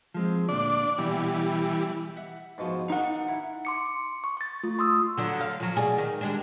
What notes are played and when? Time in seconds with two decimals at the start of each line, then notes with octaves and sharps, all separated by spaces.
0.14 F3 G#3 C4
0.49 D2 A#2 D4 D5
0.98 B2 E3 G3
2.17 E5 F#5
2.58 G#2 B2 F3
2.90 D#3 D#4 F#5
3.29 E4
3.65 C6 D6 C#7
4.24 C#6
4.37 C#6 A6
4.64 A3 F4
4.79 C6 D#6 E6
5.17 D3 F#3 D4
5.41 F5
5.60 F3 F#3
5.76 B2 G#4 D5
5.98 D#3
6.21 G3 G#3 D4